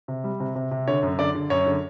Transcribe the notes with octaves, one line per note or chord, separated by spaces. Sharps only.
C3
G3
C3
C3
C3
D3 C#5
F#2
D3 D5
D3
F#2 C#5
D3